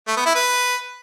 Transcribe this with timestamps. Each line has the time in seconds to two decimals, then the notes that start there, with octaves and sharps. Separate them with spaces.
0.08 A3
0.17 B3
0.26 E4
0.35 B4